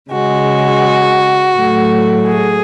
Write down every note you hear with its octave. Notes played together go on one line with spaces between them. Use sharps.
C#3 G#3 F#4
A2 F#3 A3
G#4